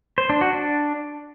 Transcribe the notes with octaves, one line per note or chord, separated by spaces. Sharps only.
C5
D4
F#4
D4